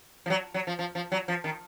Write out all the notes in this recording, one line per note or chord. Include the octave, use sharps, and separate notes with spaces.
F3
F#3
F#3
F3
F3
F3
F#3
F3
D#3